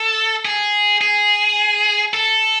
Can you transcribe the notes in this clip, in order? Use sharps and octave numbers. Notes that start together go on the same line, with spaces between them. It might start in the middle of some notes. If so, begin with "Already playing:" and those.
Already playing: A4
G#4
G#4
A4